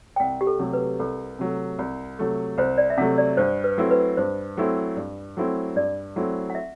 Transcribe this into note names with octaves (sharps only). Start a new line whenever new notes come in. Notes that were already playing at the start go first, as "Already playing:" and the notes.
G5
C2 F#5
G4
A4
C3 F#3 A3
B4
C2 A4
C3 F#3 A3
C2
C3 F#3 A3
C2 C5
D5
E5
C3 F#3 A3 F#5
D5
G2 C5
B4
F#3 A3 C4 E4
B4
G2 C5
F#3 A3 C4 E4
G2
F#3 A3 C4 E4
G2 D5
F#3 A3 C4 E4
F#5
E5